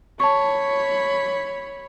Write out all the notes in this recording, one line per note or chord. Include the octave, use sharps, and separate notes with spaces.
C#5 A5 B5 C#6